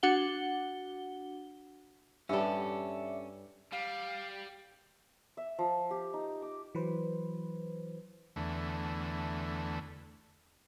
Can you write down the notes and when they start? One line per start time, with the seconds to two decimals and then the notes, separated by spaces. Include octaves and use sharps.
0.03 D4 F#4 F#5 G7
2.29 G2 G3 C#4 A4 D5 E5
3.72 G3 F5
5.37 E5
5.59 F3
5.91 G4
6.13 D#4
6.42 D6
6.75 E3 F#3 B4 C5
8.36 E2 D3 A3